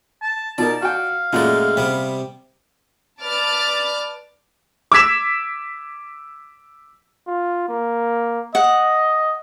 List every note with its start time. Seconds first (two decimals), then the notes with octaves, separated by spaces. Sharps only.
0.22 A5
0.58 B2 D#4 A#4 D5 A5
0.82 F#4 F5 G5
1.33 F#2 A#2 G#3 A3 D5
1.77 C3 G3 B3
3.22 B4 D5 A5 D6 F6 A6
4.92 D6 E6 G#6 B6 E7
7.27 F4
7.69 A#3
8.55 D#5 F#5